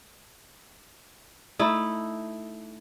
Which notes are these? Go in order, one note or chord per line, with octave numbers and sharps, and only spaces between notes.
A3 D#4 E4